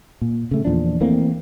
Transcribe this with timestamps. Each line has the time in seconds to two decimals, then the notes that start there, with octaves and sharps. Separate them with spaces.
0.22 A#2
0.51 C#3 A3
0.65 E2 A#2 F3 D4
1.01 E3 A3 A#3 C4